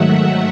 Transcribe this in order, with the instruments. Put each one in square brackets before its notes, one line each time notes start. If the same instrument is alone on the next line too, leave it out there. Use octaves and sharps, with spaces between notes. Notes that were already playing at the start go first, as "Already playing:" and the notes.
Already playing: [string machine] G#2 D#3 F#3 A3 E5 F#5